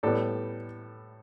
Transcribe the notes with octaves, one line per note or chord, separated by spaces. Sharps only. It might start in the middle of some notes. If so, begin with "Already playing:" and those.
A2 G3 B3 A4 D5